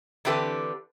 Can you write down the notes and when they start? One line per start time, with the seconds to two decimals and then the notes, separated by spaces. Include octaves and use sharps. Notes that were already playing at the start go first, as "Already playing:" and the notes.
0.25 D3 E3 C4 G4 A4 B4